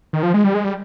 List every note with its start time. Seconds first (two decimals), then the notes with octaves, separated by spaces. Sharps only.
0.13 D#3
0.23 F3
0.34 G#3
0.44 G3
0.54 G#3
0.64 G3